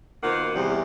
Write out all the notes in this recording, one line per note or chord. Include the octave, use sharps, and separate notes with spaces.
B2 D#3 A#3 F4 C5 F#5
E2 C3 G3